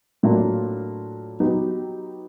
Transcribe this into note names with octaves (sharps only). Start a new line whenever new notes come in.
A2 F#3 A#3 D4 F4
F#3 B3 D#4 G4